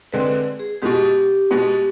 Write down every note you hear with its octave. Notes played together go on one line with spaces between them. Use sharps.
D3 G#3 C4 B4
G#4
B2 G#3 B3 G4
B2 G#3 B3